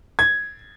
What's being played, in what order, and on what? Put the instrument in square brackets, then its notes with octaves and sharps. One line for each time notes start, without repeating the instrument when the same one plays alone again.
[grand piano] G#6